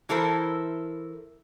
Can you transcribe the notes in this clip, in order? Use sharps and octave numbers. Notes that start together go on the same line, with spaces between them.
E3 E4 A4 A#4 C5